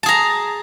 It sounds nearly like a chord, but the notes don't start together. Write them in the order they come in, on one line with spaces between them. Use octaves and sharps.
A5 G#4 A#5